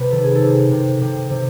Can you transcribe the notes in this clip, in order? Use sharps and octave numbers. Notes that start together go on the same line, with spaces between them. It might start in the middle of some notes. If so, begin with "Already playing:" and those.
Already playing: C3 B4
D#3 A4
G#4
A4
C3
C3
C3
C3